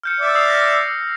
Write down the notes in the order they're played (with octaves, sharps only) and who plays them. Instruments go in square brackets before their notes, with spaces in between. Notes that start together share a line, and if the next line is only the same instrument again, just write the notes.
[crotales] F6 G6 C#7
[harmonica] D5 E5
[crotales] D#6 E6 C7
F6 A#6